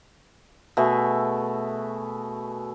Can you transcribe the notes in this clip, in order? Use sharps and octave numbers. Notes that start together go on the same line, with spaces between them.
B2 A3 G#4 E5